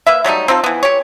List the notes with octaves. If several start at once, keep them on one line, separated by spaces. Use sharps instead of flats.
A#3 B4 E5
F#3 G3 A3 D#4
C4 D#4 F4 A4
E3 B3
G4 C#5